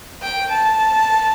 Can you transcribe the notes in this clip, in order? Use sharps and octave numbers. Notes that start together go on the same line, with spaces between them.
G5
A5